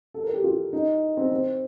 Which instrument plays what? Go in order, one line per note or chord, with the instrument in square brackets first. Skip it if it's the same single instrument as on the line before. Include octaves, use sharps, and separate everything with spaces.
[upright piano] A4
A#4
G4
F4
D#4
C4
C4